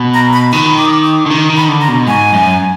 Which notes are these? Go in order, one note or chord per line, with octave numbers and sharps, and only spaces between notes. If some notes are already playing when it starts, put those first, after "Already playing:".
Already playing: B2
A#5
B5
D#3 B5
D6
D#6
D6
D6
D3
D#3
D#3
B5
D3
A#5
B2
G#2 G#5
F#2